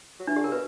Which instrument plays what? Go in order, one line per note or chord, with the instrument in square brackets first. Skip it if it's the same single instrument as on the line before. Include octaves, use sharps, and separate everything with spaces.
[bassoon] F#3
[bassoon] E3 [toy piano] D4
[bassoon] D3 [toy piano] G4
[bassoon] C#3 [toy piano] A#4
[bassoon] B2 [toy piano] B4